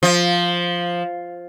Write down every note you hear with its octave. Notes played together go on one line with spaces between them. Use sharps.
F3